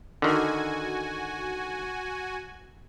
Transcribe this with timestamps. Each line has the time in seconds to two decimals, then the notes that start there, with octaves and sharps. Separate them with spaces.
0.22 D3 D#3 F#4 G#5